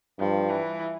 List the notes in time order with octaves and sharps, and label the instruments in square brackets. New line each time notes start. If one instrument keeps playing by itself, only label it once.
[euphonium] G2 [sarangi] F3
[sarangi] E3